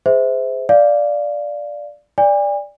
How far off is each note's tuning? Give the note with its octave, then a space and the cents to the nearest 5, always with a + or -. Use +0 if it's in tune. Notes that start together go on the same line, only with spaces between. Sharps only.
G#4 +5 C5 -20 E5 -15
D5 +0 F5 +0
D5 +0 G#5 -40